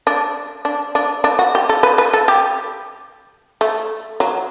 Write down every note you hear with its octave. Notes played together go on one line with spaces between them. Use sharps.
D4
D4
D4
D4
F#4
G4
A4
B4
B4
A4
G4
A3
F#3